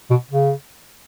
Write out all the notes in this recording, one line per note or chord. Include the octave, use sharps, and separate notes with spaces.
B2
C#3